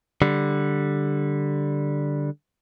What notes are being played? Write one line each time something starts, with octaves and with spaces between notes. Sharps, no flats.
D3 G3